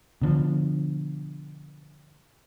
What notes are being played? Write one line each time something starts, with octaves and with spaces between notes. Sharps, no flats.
B2 D3 F3